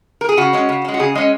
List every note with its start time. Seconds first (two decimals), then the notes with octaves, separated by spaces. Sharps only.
0.21 A#4
0.29 G#4
0.37 C#3 F#4
0.53 G#3 C#4
0.69 C#3
0.85 G#3 C#4
0.94 F#4
0.99 C#3 G#4
1.15 G#3 C#4 D#5